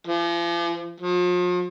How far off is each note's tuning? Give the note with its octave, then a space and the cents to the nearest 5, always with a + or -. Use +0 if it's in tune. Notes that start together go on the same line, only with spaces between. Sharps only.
F3 -40
F3 +40